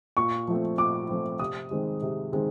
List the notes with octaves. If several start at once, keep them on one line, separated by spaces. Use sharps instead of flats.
A#2 C#6
F3 A3 C4
A#2 D6
F3 A3 C4
C3 D#6
D#3 G#3 C4
C3
D#3 G#3 C4